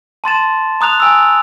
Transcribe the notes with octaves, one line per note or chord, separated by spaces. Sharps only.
A5 C6 A6 E7
A#5 D#6 F#6 F7
G#5 E6